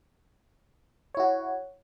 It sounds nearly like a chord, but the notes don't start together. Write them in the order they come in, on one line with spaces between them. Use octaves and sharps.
C#5 E4 F#4